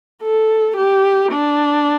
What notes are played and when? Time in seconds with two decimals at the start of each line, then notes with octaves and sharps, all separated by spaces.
0.22 A4
0.77 G4
1.32 D4